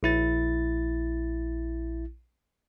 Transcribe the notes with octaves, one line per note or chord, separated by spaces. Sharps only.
A#1 E4 A6